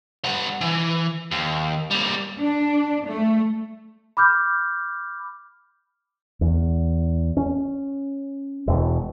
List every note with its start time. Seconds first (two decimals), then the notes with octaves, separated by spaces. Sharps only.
0.24 G3 F#5
0.61 E3
1.31 D#2
1.91 G3 A#3
2.39 D4
3.06 A3
4.17 B5 D6 F6 G6
6.41 E2
7.37 C#4
8.67 E1